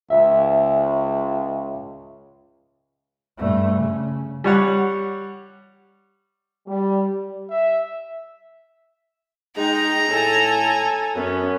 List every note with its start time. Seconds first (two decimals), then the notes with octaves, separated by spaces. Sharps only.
0.10 C#2 E5
3.38 G2 A3
3.75 C#3
4.44 G3 C#5 F#5
6.66 G3
7.50 E5
9.57 G#3 D#4 G5 A#5
10.10 A2 A4 G#5
11.15 F#2 B3 C#4